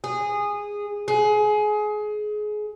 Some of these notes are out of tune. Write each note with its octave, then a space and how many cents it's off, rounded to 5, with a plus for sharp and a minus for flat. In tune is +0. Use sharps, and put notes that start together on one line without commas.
G#4 -15
G#4 +25